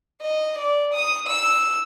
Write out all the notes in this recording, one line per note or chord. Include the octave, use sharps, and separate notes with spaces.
D#5
D5
D#6
E6